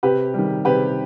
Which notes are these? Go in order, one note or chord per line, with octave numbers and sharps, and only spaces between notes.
C3 G4 B4
D#3 G3
C3 G4 B4